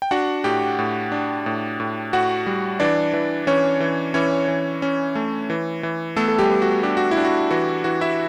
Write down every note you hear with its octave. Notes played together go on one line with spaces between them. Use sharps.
G5
D4 F#4 F#5
A2 G4 G5
A2
D4
A2
A2
A2 F#4 F#5
G3
E3 D4 D5
E3
E3 C#4 C#5
E3
E3 C#4 C#5
E3
C#4
A3
E3
E3
A3 B3 A4
A4
G3 G4
B3
F#4
D4 G4
F#4
E4
D4
F#4
E3 F#4
E3 F#4
E4 E5